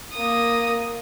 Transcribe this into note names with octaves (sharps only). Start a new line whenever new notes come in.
A#3 D#6